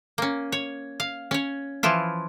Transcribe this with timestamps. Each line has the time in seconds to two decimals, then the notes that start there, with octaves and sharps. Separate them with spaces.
0.18 A#3 C#4
0.52 C#5
1.00 F5
1.31 C#4 C#5
1.83 E3 F3 E4 F4